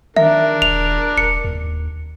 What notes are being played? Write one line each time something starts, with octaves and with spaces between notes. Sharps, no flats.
D#3 D4 A#4 E5
D#1 F7
D#1 C#7
D#2